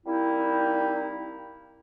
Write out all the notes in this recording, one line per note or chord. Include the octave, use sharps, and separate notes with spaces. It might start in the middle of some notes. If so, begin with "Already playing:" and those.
G3 A#3 C4 D#4 E4